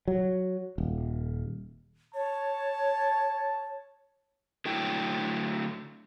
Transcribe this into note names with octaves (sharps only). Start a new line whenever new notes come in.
F#3
D#1
C#5 A5
D3 F#3 A3 E4 G5